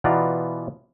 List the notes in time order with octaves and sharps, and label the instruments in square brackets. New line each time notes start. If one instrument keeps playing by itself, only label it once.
[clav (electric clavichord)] B2 E3 B3 F4 D5 A#5